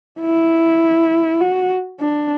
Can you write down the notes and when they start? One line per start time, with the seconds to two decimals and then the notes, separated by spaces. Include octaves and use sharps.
0.20 E4
1.41 F#4
2.00 D4